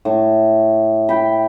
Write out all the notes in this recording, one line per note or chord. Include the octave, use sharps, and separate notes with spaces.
A2
G5 B5